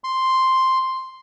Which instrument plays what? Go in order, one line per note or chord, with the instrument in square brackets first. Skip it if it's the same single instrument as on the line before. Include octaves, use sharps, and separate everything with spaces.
[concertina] C6